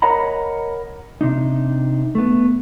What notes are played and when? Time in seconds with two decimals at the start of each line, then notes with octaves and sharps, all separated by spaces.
0.02 A#4 C#5 D#5 F#5 A#5 B5
1.21 C3 D4 D#4
2.15 A3 B3